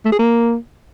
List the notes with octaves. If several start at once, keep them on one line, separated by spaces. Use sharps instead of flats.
A3
G#4
A#3